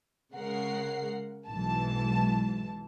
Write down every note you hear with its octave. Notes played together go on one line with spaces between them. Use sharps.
C#3 G#3 A#4 F#5 C7
B1 G#2 E3 A5